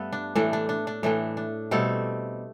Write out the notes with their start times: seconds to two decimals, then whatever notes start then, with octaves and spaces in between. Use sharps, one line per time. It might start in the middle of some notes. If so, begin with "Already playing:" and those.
Already playing: G2 A3 B3 A4
0.13 D4
0.35 A2 E3 A3 D4
0.53 D4
0.69 D4
0.87 D4
1.03 A2 E3 A3 D4
1.37 D4
1.71 B2 G3 A3 C4 A4